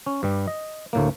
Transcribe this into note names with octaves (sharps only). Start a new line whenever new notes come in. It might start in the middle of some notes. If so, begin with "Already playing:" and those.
C#4
G2 G3
D#5
D2 A2 A#3